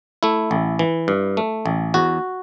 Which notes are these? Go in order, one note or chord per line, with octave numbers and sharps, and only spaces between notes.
A3 E4
A1
E3
G2
A3
A1
E2 F#4